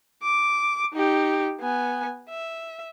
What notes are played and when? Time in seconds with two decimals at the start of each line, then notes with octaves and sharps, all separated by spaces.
0.23 D6
0.94 D#4 G4
1.60 B3 G#5
2.29 E5